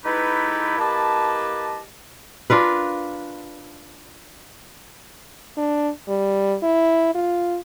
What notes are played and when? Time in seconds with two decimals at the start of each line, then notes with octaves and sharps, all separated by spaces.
0.05 G#3 D#4 E4 G4 A4 B4
0.79 A#3 E4 G4 B4 D#5 A5
2.50 D4 F4 A#4 B4
5.57 D4
6.08 G3
6.62 E4
7.15 F4